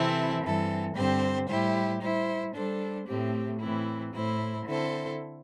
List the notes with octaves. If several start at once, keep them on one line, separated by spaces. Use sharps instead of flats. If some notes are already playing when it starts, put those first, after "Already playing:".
Already playing: C3 E3 C4 E4 A4
G2 E3 C4 A4
G2 D3 C4 G4 C5
A2 G3 E4 G4 C5
G3 E4 C5
G3 D4 A4 C5
A2 A3 C4 G4
A2 E3 C4 E4
A2 A3 E4 C5
D3 C4 E4 A4 C5